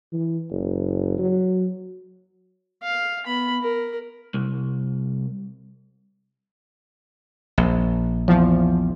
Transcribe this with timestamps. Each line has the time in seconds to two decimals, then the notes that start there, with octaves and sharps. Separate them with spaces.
0.13 E3
0.51 F#1
1.18 F#3
2.83 F5
3.26 B3 B5
3.62 A#4
4.34 C2
7.58 A#1
8.28 E2 F3